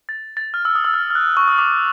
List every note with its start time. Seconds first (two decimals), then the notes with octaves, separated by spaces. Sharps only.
0.09 A6
0.37 A6
0.54 F6
0.65 E6
0.75 D#6
0.85 E6
0.94 F6
1.10 F6
1.15 F#6
1.37 C#6
1.48 D#6
1.58 D6